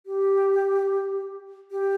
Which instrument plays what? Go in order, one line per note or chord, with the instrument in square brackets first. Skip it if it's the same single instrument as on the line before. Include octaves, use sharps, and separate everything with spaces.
[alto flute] G4
G4